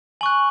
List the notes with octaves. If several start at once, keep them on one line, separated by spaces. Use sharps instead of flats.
G#5 C#6 F#6 F#7